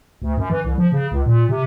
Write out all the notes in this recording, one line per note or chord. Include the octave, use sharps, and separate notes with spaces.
D2
F#2
E3
C2
F3
C#3
C#2
A#2
C3